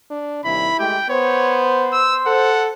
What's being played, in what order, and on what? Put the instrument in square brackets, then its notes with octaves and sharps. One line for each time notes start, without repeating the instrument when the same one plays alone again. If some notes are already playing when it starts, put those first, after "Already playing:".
[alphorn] D4
[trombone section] D#2 C3 G3 [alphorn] E4 [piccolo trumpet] B5
[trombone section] G#3 A3 G4 [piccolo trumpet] G5
[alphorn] B3 [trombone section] C5 [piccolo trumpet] C#5
[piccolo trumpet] E6
[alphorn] A4 [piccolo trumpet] F#5